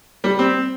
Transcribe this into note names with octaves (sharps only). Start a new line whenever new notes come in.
G3
C4